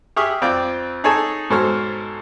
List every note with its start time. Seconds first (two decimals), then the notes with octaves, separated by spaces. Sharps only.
0.16 G4 G#4 E5 C#6 D#6 F6
0.42 F2 C4 F4 D5 G5 D6
1.04 D#4 G#4 A4 C#5 G#5 A5
1.50 G#2 B2 A4 C5 C#5 F6